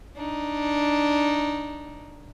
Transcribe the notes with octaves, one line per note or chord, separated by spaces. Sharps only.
D4 D#4